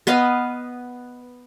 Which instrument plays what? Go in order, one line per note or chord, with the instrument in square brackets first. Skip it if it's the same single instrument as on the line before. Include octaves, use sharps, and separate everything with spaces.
[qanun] B3 B4 D#5 F5